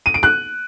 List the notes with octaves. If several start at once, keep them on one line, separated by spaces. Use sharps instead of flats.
D#7
D7
F#6